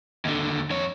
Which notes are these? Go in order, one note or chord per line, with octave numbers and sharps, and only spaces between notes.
D#2 D3
F2 C#5